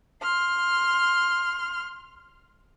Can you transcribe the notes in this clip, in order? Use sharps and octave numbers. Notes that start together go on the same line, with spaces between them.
C6 F6